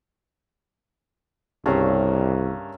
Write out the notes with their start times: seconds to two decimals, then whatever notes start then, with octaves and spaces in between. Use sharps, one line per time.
1.66 C2 G2 C#3 A#3 C#4 E5 F5